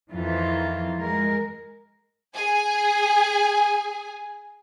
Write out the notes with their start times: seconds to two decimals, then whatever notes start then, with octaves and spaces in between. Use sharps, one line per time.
0.12 F2 D#3 E3 F4
0.99 G#3 A#4
2.35 G#4 G#5